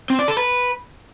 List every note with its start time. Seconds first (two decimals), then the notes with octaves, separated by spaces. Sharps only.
0.10 C4
0.19 D5
0.28 A4
0.37 B4